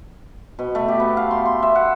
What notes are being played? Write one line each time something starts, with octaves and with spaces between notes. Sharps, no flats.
B2
A3
G4
B3
F5
C6
C6
E5
F#5